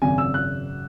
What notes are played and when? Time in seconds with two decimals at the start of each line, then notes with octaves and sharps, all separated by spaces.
0.02 G#1 F#2 C#3 G#5
0.18 E6
0.34 F#6